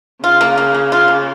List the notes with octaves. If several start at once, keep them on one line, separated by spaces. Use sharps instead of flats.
C#3 F4
A#3
A#3
A#3
F4
A#3